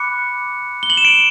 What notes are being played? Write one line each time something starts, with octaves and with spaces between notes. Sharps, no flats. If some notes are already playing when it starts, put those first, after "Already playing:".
Already playing: B5 D6 F#6 C#7
G7
F#7
E7
D7